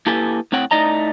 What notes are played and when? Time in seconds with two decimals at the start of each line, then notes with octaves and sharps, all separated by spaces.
0.06 A#3 E4 G4 A4 B4 G#5
0.52 A2 C4 C#5 F#5 G5
0.71 A2 A3 D#4 D5 D#5 A#5